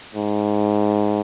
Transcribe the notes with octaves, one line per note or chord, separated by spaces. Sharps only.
G#2